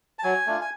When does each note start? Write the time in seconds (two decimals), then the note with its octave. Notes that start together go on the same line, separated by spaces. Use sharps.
0.19 A5
0.23 F#3 G#5
0.46 A3 D4 F4
0.61 G#5